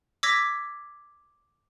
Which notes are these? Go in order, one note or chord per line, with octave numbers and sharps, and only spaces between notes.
D6 E6 G#6 A#6 B6